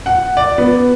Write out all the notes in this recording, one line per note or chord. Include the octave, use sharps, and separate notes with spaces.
F#5
D5
B3